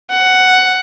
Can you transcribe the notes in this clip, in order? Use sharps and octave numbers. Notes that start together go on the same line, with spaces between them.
F#5